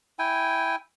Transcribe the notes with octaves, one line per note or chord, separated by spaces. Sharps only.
E4 G5 G#5